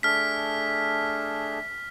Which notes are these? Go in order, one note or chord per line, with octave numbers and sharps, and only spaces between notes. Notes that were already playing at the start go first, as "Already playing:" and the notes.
A3 D4 G#4 F6 B6